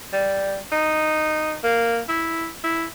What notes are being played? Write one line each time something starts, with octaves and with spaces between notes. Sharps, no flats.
G3
D#4
A#3
E4
E4